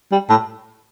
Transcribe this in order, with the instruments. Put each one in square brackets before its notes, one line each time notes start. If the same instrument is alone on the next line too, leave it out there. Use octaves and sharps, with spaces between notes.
[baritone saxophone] G3
A2